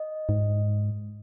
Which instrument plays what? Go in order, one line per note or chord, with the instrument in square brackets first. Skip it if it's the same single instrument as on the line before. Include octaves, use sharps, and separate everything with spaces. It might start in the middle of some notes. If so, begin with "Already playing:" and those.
Already playing: [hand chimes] D#5
[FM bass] G#2